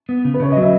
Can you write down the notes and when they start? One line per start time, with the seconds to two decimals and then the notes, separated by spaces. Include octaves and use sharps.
0.09 B3
0.25 C#3
0.34 B4
0.40 C#3 C#5
0.52 F#3 D#5
0.62 E5